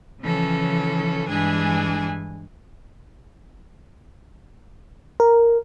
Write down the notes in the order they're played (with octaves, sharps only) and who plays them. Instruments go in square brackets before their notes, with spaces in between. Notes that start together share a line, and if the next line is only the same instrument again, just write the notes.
[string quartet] C#3 E3 F3 C#4 A4
G2 E3 G#3 D4 G#4 G#5
[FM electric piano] A#4